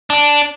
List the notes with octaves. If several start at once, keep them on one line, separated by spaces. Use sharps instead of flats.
D4